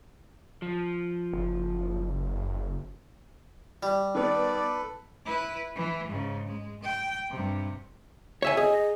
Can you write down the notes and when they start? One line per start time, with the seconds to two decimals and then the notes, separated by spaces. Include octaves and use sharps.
0.62 F3
1.33 F#1
3.83 G3
4.15 D#3 B3 A4 B4 D5
5.26 E4 B4
5.76 E3
6.08 G#2 C#3
6.47 G#3
6.83 G5
7.30 G2 C3
8.42 C#5 E5 G#5
8.57 G#4 D#5